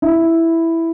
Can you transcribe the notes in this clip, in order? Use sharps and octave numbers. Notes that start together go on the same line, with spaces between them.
E4